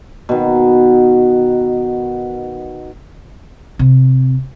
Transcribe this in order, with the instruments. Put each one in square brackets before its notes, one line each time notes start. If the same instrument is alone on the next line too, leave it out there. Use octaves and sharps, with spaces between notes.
[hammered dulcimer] B2 D#3
[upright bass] C3